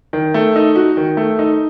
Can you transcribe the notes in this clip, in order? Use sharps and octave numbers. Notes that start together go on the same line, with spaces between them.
D#3
A3
D#4
F#4
D#3
A3
D#4